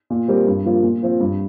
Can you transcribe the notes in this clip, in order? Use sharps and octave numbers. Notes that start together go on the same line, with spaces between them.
A#2
G3 C4 G4 A#4
G2
F3 A#3 F4
A#2
F3 C4 F4
G2